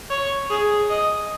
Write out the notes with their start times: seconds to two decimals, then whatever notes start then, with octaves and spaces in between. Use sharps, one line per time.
0.10 C#5
0.51 G#4
0.90 D#5